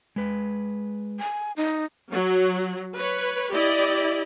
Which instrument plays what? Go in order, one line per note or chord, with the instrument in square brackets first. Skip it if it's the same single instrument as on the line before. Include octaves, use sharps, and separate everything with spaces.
[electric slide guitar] G#3 B4
[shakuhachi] G#5
D#4
[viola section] F#3
B4 C#5
E4 G4 D5 D#5